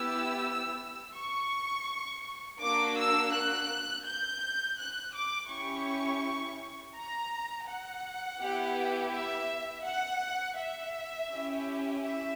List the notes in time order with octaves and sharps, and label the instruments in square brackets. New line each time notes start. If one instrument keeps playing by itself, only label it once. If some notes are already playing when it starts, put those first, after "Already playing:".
Already playing: [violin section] B3 E4 G4 E6
C#6
A#3 D4 F#4 D6
E6
F#6
G6
F#6
D6
C#4 E4 G4 C#6
A#5
F#5
B3 E4 G4
E5
F#5
E5
C#4 E4 G4
E5